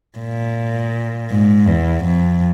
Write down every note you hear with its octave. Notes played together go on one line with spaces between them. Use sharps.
A#2
G#2
E2
F2